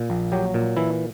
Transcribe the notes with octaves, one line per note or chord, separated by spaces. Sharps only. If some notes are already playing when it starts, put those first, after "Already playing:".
Already playing: A#2
A#1
F#3 G4
A#2
E3 E4